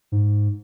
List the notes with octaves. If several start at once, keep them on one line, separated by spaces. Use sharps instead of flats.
G#2